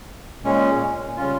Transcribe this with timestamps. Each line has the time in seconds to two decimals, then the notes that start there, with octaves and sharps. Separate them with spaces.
0.44 A#2 G#3 C#4
1.17 C#3 G3 C#4 F4